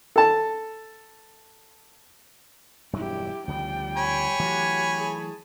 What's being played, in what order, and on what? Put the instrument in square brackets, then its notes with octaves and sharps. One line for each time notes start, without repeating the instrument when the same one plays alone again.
[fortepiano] A4 A5
[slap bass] E1 G2 F#3 [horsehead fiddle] E4 G4
[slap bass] D2 C#3 F3 [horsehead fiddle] G3 G5
[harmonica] C#5 G#5 B5
[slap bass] E3 F#3 A3 [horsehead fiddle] F#4 G4
[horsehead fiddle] G#4 A5